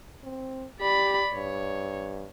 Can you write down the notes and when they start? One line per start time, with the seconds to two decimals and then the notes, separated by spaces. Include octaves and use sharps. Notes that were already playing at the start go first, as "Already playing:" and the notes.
0.24 C4
0.80 G4 D5 B5
1.33 G2 C#5